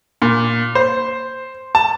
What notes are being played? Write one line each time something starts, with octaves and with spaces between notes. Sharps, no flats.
A#2
C5
A5